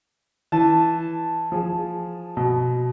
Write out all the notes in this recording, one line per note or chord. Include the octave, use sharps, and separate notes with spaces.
E3 A5
F3 G#4
B2